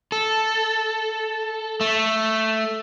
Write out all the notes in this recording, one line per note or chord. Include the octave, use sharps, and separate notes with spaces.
A4
A3